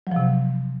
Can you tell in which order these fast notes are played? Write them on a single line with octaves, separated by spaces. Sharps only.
F#3 F3 C3